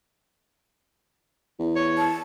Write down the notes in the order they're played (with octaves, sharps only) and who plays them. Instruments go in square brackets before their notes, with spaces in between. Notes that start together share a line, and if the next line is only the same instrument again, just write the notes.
[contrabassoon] E2
[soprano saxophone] C#5
[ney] A5